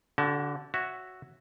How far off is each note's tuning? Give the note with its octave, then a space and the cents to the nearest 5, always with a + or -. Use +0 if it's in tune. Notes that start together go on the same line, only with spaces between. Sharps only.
D3 -15 F#4 +35
F#4 +0 C#5 +0 E5 +0